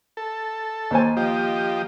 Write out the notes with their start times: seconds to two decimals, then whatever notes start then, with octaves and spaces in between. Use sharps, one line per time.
0.17 A4
0.91 D#2 C5 G#5
1.17 F3 G4 D#5